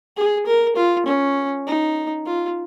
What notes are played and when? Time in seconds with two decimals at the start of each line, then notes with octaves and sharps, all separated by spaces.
0.17 G#4
0.46 A#4
0.76 F4
1.07 C#4
1.67 D#4
2.27 F4